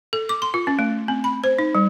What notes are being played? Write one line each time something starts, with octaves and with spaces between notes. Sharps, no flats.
A4
D6
C6
F4
C#4
A3
C4
B5
C5
D#4
G3